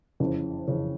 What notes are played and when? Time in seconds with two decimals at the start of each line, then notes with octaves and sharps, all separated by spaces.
0.20 F#1 F2 C#3 E3
0.67 F#1 F2 C#3 E3